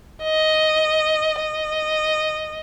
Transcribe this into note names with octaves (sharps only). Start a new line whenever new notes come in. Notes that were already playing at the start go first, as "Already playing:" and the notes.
D#5
D#5